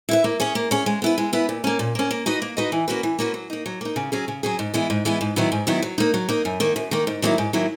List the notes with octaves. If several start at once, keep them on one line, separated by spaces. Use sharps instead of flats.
E4 B4 E5
A#3
C#4 G#4 C#5
A#3
C#4 G#4 C#5
G#3
B3 E4 B4
G#3
B3 E4 B4
A#2
A#3 C#4
A#2
A#3 C#4
A#3
D#4 F#4 B4 D#5
A#3
D#4 F#4 B4 D#5
E3
A#3 C#4 F#4 B4
E3
A#3 C#4 F#4 B4
F#3
A#3 D#4
F#3
A#3 D#4
C#3
F#3 C#4 G#4
C#3
F#3 C#4 G#4
G#2
E3 G#3 B3 E4
G#2
E3 G#3 B3 E4
G#2
D#3 F#3 B3 E4
G#2
D#3 F#3 B3 E4
F#3
A#3 D#4
F#3
A#3 D#4
F#2
D#3 A#3
F#2
D#3 A#3
G#2
D#3 F#3 A#3 E4
G#2
D#3 F#3 A#3 E4